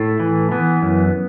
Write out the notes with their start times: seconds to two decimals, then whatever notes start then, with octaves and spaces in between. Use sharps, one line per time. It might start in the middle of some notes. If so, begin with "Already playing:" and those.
Already playing: A2 A3
0.20 E3
0.52 E3 B3
0.82 F#2